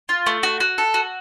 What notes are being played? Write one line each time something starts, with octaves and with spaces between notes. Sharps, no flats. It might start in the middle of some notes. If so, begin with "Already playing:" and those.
F4
A3
F#4
F#4
A4
F#4